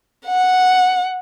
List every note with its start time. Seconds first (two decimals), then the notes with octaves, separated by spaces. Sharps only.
0.26 F#5